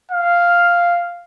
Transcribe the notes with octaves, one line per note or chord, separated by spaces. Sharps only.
F5